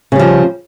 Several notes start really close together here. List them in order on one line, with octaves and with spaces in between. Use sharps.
C#3 G3 F3